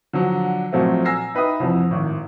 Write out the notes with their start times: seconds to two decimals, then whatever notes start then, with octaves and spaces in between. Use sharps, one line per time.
0.13 D3 F3 F#3
0.73 A#2 F3 F#3 A3 C4
1.05 G#5 A#5 E6 A#6 C7
1.35 D#4 B4 E5 G5 D#6
1.60 C2 F2 E3 F3
1.91 G#1 A2